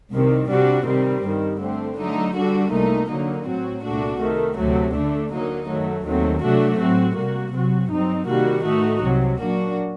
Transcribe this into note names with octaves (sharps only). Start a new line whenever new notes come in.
C2 C3 D#3
C3 G3 D4 F#4
C3 D#3 G3 C4
G2 D#3 G3
D3 A3 C4
D3 F#3 A3 D#4
D3 G3 D4 F#4
C2 A#2 A3 D#4
D3 F#3 A#3 D#4
A2 F#3 C4 F#4
C2 A#2 A3 D4 F#4
C3 D#3 A3
D2 C3 F#3 A3
D3 A3 D4
D3 F#3 A#3 D#4
F#2 D#3 F#3 A3
D#2 D#3 F#3 A3 C4
C3 F#3 A3 D4 F#4
A2 F#3 C4 F#4
C3 G3 A#3 F#4
C3 F#3 C4 F#4
G2 F#3 C4 D#4
C3 D#3 G3 A#3 F#4
A2 A3 D#4 F#4
C2 C3 F#3
A#2 F#3 A#3 D4 F#4